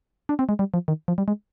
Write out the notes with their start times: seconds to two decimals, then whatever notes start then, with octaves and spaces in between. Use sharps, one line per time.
0.29 D4
0.39 C4
0.49 G#3
0.59 G3
0.74 F3
0.88 D#3
1.08 F3
1.18 G3
1.28 G#3